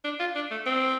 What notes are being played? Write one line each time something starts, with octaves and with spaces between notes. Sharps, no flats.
D4
F4
D4
A3
C4